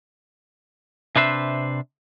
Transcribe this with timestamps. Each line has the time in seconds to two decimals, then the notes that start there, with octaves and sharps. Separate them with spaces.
1.16 C3 D4 B4 C5 E5